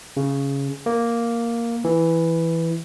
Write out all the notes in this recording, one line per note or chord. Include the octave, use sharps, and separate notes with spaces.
C#3
A#3
E3